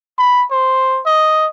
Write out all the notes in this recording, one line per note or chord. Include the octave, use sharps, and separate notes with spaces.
B5
C5
D#5